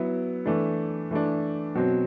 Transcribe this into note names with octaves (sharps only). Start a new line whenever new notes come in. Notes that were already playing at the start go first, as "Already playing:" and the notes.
Already playing: F#3 B3 E4
E3 A3 D4
E3 A3 D4
B2 F#3 C4